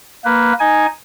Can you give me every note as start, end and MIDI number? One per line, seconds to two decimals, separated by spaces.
0.25 0.53 58
0.25 0.53 71
0.60 0.87 63
0.60 0.87 80